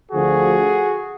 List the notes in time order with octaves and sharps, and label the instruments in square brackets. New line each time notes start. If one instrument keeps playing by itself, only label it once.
[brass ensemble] D2 D3 F3 F#4 G#4